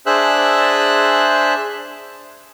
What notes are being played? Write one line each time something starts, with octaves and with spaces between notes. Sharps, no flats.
D4 G#4 C5 E5 E6 F#6